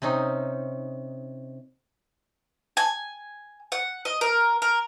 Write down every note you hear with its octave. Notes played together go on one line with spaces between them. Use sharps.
C3 C4 C#4 D#4
G#5
F#5
D#5
A#4
A#4